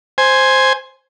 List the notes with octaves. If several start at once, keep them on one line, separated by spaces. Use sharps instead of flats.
C5 G#5